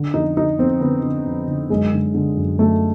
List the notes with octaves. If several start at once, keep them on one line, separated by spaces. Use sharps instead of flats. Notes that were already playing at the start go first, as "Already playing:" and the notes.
Already playing: D3
F2 D#4
D3 D#4
F2 C4
D3 B3
D3
F2
D3
F#2 G#3
D3
D3
F#2
F#2 A3